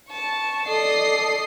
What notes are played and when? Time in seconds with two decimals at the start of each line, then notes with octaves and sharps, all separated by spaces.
0.10 A5 C#6
0.67 A4 D5 D#5 C7